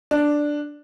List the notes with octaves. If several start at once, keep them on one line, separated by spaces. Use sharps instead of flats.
D4